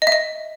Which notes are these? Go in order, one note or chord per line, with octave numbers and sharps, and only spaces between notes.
D#5
E5
D#5